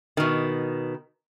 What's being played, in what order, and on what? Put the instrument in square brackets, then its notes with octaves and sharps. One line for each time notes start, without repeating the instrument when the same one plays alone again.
[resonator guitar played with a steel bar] B2 D#3